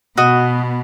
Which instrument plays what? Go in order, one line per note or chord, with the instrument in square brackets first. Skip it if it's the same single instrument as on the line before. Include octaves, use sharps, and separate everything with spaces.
[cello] B2 B3 [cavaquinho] F#4 D#5